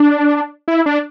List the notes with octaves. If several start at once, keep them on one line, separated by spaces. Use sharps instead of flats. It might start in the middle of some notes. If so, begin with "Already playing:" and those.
Already playing: D4
E4
D4